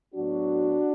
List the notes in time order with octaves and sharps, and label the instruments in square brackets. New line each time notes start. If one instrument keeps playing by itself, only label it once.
[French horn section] A2 F#3 B3 D4 F#4